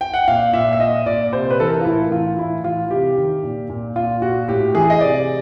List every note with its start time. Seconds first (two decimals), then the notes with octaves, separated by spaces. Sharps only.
0.01 G5
0.14 F#5
0.28 A#2 F5
0.53 A#2 E5
0.73 E5
0.80 A#2 D#5
1.06 A#2 D5
1.33 C3 C5
1.50 B4
1.60 E3 A4
1.68 A#4
1.81 F4
1.85 A2 E4
2.11 E3 F4
2.38 A2 E4
2.64 E3 F4
2.91 C3 G4
3.17 D#3
3.43 A#2
3.70 A#2
3.96 A#2 F4
4.22 A#2 F#4
4.48 A2 G4
4.75 E3 G#4
4.90 D#5
5.01 C3 D5